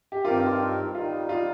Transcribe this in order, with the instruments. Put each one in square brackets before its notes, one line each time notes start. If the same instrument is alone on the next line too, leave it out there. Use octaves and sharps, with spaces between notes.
[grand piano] G4
[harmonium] G2 D#3 C4 G4 A#4 [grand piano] F4
[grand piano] F4
[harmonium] D#3 G3 D#4 [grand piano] F4
[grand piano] F4